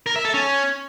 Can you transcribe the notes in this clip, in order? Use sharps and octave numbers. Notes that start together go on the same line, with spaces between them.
A#4
E5
A4
C#4